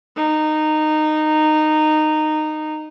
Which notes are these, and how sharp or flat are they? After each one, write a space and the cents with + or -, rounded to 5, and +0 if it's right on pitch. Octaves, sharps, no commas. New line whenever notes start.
D#4 -15